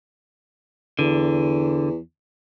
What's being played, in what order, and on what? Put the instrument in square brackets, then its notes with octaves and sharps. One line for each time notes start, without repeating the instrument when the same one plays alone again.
[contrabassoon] E2 [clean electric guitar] D3